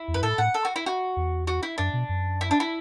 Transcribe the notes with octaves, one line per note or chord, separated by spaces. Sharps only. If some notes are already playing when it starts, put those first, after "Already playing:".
Already playing: E4
E2
F#2 B4
A2 A4
A2 F#5
A4
F#4
E4
F#4
E2
F#4
E4
F#2 D4
B2
F#2
E4
D4
E4